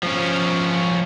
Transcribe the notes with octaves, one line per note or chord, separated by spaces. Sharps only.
F3 C#4